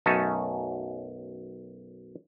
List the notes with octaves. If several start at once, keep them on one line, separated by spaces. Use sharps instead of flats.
B1 F#2 A3 C#4 D#4 A5